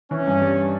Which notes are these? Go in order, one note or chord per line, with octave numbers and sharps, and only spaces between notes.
E3 C#4
G2
G3